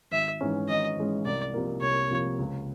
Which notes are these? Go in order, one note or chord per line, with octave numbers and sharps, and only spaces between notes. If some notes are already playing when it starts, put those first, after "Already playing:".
G#1 E5
G#2 E3 G#3 C#4
G#1 D#5
G#2 E3 G#3 C#4
C2 D5
C3 F3 A#3
C2 C#5
C3 F3 A#3
C#2